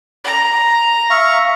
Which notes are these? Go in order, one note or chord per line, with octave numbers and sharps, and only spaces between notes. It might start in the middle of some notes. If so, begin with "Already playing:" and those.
A#5
E5 F5 C#6